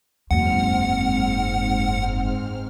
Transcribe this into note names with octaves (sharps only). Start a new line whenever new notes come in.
F#1 E2 G#2 C4 F#5 F6